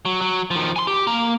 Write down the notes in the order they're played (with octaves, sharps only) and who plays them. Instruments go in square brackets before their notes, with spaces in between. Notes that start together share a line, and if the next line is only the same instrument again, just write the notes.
[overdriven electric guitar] F#3
F#3
D#3 F3
G#5 C6
G4
A#3 A#5